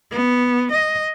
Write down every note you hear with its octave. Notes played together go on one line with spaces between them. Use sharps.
B3
D#5